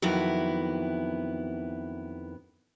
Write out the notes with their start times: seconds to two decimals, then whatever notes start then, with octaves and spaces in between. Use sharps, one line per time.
0.02 F2 D#3 E3 F#3 B3 E4